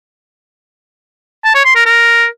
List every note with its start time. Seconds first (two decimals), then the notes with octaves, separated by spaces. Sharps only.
1.44 A5
1.54 C#5
1.65 C6
1.75 A#4
1.86 A#4